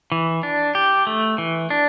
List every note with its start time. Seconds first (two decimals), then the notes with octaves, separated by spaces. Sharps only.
0.12 E3
0.43 D4
0.75 G4
1.07 A3
1.38 E3
1.70 D4